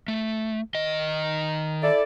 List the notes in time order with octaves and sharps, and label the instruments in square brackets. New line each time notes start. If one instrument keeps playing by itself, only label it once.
[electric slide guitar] A3
D#3 D#5
[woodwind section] E4 A4 D5